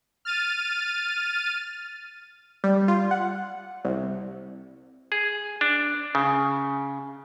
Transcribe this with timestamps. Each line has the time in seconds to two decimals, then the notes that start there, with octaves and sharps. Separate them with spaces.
0.25 F6 A6 D#7
2.64 G3
2.88 F4
3.11 F#5
3.85 C2
5.12 G#4
5.61 D4
6.15 C#3